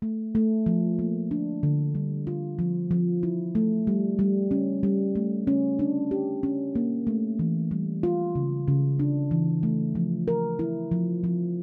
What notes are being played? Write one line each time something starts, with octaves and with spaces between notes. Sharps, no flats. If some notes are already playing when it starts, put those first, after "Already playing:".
A3
A3
F3
A#3
D4
D3
G3
F4
F3
F3
E4
A3
G3
G3
C#4
G3
A3
C#4
D4
G4
C#4
A#3
A3
E3
G3
F4
C#3
C#3
D4
E3
A3
F3
A#4
E4
F3
F3